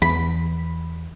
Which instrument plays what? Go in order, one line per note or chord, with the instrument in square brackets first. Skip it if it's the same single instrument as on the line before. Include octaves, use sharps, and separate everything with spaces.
[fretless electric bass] E2 [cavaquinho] B5